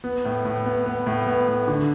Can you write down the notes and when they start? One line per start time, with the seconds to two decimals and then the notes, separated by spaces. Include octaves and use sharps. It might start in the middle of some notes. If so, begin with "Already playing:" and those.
0.04 B3
0.25 A2
0.45 A2
0.66 B3
0.86 B3
1.07 A2
1.27 B3
1.47 A2
1.68 D3